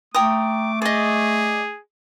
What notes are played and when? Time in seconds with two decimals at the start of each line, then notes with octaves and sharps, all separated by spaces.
0.15 A3 G5 A#5 D6 D#6
0.82 G#4 D5 D#5